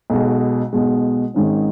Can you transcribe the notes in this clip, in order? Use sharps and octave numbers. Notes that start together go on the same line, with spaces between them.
B1 B2 G#3
B1 B2 G#3
G#1 G#2 D#3 G#3 C#4